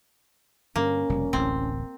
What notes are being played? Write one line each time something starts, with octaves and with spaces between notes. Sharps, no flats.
G2 D3 A#3 C#4
F1 B2 G3
D1 A1 A2 C4